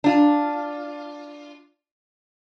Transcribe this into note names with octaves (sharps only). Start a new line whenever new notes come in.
D4 F4